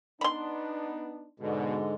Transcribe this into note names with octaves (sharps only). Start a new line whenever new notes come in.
B3 D4 D#4 B5 C6
G#2 B2 D3 G#3